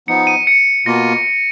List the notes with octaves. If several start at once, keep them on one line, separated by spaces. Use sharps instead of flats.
F3 B3 D#4 C#7
D#7
C#7
B2 A#3 F4 A#6